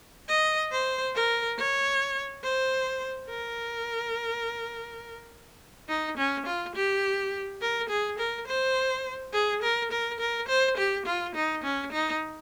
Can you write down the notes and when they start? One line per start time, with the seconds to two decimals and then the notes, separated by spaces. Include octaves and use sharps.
0.28 D#5
0.72 C5
1.15 A#4
1.58 C#5
2.44 C5
3.30 A#4
5.89 D#4
6.18 C#4
6.46 F4
6.75 G4
7.61 A#4
7.89 G#4
8.19 A#4
8.47 C5
9.33 G#4
9.62 A#4
9.91 A#4
10.20 A#4
10.48 C5
10.77 G4
11.06 F4
11.35 D#4
11.64 C#4
11.92 D#4